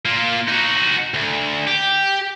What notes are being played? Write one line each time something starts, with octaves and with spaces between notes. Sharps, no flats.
A#3 F4
D#4 F#4
D2
G4